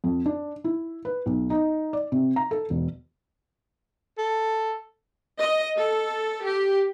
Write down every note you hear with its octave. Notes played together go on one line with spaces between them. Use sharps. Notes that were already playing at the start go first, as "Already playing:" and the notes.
F2
D4
E4
B4
B1
D#4
D5
C3
A#5
A4
E1
A4
D#5
A4
G4